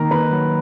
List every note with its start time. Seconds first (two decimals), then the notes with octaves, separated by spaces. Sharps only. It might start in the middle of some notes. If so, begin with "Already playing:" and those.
Already playing: D#3 A#3 A#4 A#5
0.11 D#3 B4 B5
0.31 F#3